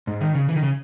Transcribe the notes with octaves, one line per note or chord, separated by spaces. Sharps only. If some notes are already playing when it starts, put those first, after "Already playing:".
G#2
D#3
C#3
E3
D#3
C#3